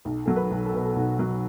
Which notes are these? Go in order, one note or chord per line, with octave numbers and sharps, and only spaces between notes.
B1
F#3 A4
B4
B1
A4
B2 B4
A4
B1 F#4
F#3